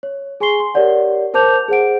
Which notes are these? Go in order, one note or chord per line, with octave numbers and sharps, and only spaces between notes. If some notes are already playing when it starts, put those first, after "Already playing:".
C#5
G#4 G#5 C6 C#6 C7 G7
C6
G4 A#4 C#5 D5 F#5
A#4 C5 A5 D6 G6 F7
G#4 C5 F#5 D7